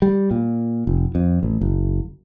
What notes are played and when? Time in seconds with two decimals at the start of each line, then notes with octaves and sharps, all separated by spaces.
0.02 G3
0.31 A#2
0.87 F1
1.15 F2
1.43 A1
1.61 F#1